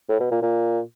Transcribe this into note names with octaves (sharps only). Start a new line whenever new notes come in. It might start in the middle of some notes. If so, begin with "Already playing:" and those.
A2
B2
A#2
A#2